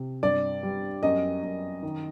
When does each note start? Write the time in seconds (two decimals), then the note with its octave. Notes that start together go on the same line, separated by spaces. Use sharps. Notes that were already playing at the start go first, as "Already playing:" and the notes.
Already playing: C3
0.23 G2 D5
0.63 G3
1.03 F#2 D#5
1.43 F#2
1.83 D#3